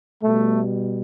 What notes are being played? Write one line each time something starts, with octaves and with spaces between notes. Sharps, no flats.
B2 G3 A3